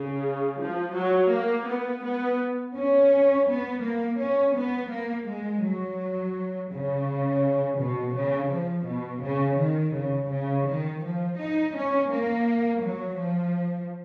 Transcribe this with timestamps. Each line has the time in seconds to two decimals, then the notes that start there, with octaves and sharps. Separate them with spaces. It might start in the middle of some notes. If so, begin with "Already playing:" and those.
Already playing: C#3
0.60 F3
0.96 F#3
1.32 A#3
1.68 B3
2.04 B3
2.76 C#4
3.48 B3
3.83 A#3
4.20 C#4
4.56 B3
4.91 A#3
5.28 G#3
5.63 F#3
6.72 C#3
7.80 B2
8.16 C#3
8.51 F3
8.87 B2
9.24 C#3
9.60 D#3
9.95 C#3
10.31 C#3
10.68 D#3
11.04 F3
11.40 D#4
11.76 C#4
12.11 A#3
12.83 F#3
13.19 F3